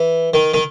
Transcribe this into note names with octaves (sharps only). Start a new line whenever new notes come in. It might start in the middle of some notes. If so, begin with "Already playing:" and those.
Already playing: E3
D#3
D#3